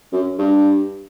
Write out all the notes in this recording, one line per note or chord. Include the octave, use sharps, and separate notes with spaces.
F#2
G2